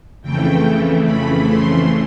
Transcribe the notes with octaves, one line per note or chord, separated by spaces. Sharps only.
F2 C#3 E3 A3 G5
B5
C6